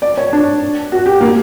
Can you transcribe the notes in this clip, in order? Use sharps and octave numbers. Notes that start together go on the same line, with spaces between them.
D5
C#5
D4
F#4
G4
A#3